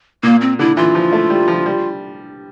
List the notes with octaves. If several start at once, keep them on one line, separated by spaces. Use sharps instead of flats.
A#2 A#3
C4
D3 E4
E3 F4
F3
A3
G3
F3
G3